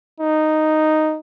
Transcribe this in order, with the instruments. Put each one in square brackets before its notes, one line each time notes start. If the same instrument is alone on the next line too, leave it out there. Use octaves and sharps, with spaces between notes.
[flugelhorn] D#4